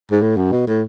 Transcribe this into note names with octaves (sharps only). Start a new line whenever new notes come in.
G#2
A2
F#2
B2
A2